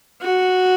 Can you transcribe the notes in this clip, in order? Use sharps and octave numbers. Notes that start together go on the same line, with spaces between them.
F#4